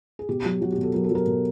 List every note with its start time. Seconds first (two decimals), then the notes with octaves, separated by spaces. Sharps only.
0.19 G#4
0.29 B2 G4
0.45 F#3
0.61 F#3 F#4
0.72 G4
0.77 B2
0.83 A4
0.94 F#3 A#4
1.04 A4
1.11 F#3 A#4
1.27 B2